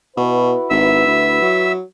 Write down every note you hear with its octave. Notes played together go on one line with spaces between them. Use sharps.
B2 E4 F#4 B4
G#1 E5 E6
D2
F#3